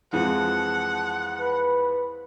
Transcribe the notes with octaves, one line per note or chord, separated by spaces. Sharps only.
F2 E3 G#3 F#5 A5
B4